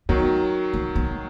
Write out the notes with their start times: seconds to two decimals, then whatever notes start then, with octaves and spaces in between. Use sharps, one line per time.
0.09 D#3 F#3 B3
0.73 A#3
0.96 B3